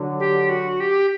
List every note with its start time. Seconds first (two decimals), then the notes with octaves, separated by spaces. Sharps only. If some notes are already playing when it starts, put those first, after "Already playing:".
Already playing: D3 F#3
0.19 G4
0.50 F#4
0.80 G4